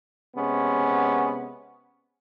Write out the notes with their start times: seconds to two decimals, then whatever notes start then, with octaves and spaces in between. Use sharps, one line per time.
0.36 C3 G#3 B3 C#4